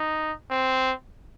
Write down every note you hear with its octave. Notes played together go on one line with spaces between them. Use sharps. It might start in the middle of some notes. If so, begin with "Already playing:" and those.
Already playing: D#4
C4